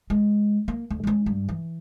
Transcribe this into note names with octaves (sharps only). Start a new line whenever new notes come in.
G#3
A#3
D2
G#3 C#4
G2
E3